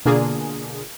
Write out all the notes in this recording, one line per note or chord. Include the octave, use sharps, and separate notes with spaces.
B2 D3 A#3 D4 F4 G#4